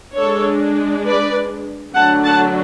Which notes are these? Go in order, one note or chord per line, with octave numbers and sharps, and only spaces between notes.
G#3 D4 A4 C#5
B4 D5
D3 F#3 A3 D4 F#5 A5
F#5 A5